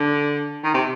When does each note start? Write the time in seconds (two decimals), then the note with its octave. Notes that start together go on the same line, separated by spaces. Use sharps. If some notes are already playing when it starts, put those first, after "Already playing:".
Already playing: D3
0.64 D#3
0.74 C3